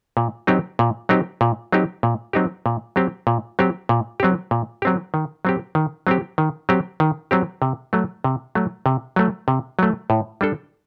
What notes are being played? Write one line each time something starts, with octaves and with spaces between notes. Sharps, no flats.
A#2
F#3 C4 D#4 G4
A#2
F#3 C4 D#4 G4
A#2
F#3 C4 D#4 G4
A#2
F#3 C4 D#4 G4
A#2
F#3 C4 G4
A#2
F#3 C4 G4
A#2
F#3 C4 G4
A#2
F#3 C4 G4
D#3
F#3 C4 G4
D#3
F#3 C4 G4
D#3
F#3 C4 G4
D#3
F#3 C4 G4
C3
F#3 A3
C3
F#3 A3
C3
F#3 A3
C3
F#3 A3
A2
G3 D4 A4